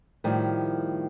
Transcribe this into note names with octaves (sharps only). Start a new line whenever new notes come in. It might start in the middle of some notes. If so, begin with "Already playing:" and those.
A2 D#3 F3 G3